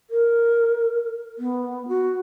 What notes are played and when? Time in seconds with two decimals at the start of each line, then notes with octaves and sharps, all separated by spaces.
0.10 A#4
1.39 B3
1.88 F#4